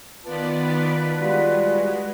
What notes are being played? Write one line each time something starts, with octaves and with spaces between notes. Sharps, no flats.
D#3 B3 F4 B4 D5 A5
G3 G#3 F4 F#4